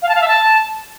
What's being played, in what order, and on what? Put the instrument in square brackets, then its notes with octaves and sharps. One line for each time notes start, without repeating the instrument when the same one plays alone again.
[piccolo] F5
A5
F5
E5
A5